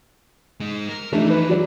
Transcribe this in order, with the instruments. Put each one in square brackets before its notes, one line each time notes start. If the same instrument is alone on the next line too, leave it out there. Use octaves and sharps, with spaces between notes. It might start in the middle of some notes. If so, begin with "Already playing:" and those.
[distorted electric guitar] G#3 D#4
A#4
[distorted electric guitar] E3 F3 [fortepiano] A3 D4 D#4
[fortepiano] B4
F#3 D5